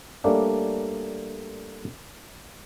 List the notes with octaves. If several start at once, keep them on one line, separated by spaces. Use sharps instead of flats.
G3 A3 A#3 C#4 D4